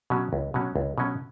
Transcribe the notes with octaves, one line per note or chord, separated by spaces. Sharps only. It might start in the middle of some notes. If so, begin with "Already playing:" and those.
B2 F#3 C#4
C#2
B2 F#3 C#4
C#2
B2 F#3 C#4